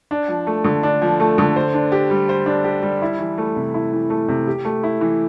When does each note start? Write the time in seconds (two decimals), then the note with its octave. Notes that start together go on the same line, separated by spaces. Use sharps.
0.11 D4
0.28 F3
0.47 A3
0.64 D3
0.83 D4
1.02 F3
1.20 A3
1.38 D3
1.56 C5
1.74 D4
1.92 G4
2.10 G3
2.29 C5
2.46 D4
2.64 G4
2.82 G3
3.02 E4
3.19 E3
3.38 A3
3.56 C3
3.74 E4
3.93 E3
4.10 A3
4.28 C3
4.47 G4
4.65 A3
4.83 E4
5.01 E3